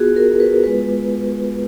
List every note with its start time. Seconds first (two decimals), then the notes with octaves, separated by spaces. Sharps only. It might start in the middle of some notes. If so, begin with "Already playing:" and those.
Already playing: B3 F4 F#4 G#4
0.16 A#4
0.40 B4
0.64 G#3 B3 F4 B4